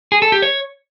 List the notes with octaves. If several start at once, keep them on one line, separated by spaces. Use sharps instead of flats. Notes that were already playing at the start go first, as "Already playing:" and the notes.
G#4
A4
G4
C#5